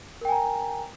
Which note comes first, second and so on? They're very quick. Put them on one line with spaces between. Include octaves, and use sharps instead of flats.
A#4 G5 G#5 A#5